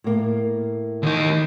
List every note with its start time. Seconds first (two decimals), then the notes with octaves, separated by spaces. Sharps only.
0.04 A2 A#3
1.03 D#2 D#4